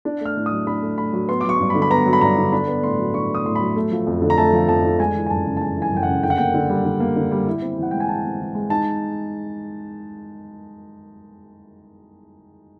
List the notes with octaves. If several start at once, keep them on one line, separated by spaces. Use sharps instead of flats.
D4
A3 F6
A2
D#6
F#3
D4 B5
A3
A2 B5
F#3
B3 C6
F#3 D6
C#6
G2
B5
D3
B5
B3 A#5
F#3
B5
G2 A#5
D3
D4 B5
B3
A2 C6
F#3
D4 C#6
B3 D#6
A2 C6
F#3 B5
A3
F3
F2
D3
A#5
A3 A5
F3
F2 A5
D3
G#3 G#5
E3
G#5
F#2 A5
C#3
A5
G#3 G#5
E3 G#5
F#2 G5
C#3 F#5
D3 G5
F#5
A#3 G5
D3
G3
D3
A#3
D3
G3
E4
C4
E3
F#5
G#3 G5
G#5
E4 A5
C4
E3
G#3
D#4 A5